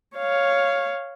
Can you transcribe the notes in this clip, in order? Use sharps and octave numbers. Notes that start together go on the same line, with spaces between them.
C#5 F5